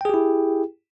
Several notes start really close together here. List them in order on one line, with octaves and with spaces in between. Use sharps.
G5 G#4 G4 E4